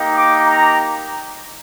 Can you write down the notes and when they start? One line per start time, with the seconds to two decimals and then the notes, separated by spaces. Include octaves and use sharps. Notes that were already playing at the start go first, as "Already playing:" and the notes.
Already playing: A#3 D#4 G4
0.13 D6
0.44 A#5